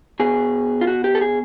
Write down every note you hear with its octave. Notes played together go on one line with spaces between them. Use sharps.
B2 G#4
F4
F#4
G4
A4
G#4